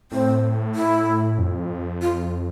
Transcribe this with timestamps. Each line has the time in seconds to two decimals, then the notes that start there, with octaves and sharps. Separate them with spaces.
0.12 A2 C4
0.75 E4
1.38 F2
2.01 F4